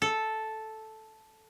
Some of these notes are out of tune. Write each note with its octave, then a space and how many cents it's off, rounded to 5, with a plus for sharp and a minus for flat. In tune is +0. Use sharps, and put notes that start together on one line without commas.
A4 -5